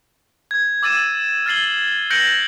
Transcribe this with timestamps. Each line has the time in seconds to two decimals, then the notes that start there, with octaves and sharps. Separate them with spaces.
0.51 G#6
0.83 D6 E6 A6 D#7 E7
1.46 F6 G#6 A6 C7 F#7 G7
2.10 F#6 G6 A#6 C#7 D7 F#7